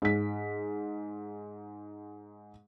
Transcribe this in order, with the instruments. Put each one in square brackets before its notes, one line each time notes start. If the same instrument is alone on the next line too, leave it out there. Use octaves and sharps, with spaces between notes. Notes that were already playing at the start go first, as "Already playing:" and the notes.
[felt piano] G#2 B6